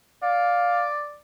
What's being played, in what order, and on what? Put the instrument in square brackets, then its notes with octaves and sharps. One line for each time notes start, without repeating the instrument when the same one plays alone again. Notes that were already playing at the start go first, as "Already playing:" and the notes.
[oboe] D5 [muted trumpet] F5